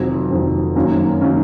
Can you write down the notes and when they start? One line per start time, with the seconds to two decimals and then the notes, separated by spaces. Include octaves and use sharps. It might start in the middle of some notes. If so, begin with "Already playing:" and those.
Already playing: F1 F2 D#3 F#3
0.31 F1 F2 D#3 F#3
0.76 F#2 D#3 F#3 A#3 C#4
1.21 D#3 F#3 A#3 C#4